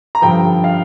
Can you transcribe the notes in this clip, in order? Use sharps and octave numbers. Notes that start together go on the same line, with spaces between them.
A#5
G2 D3 F3 G5
F5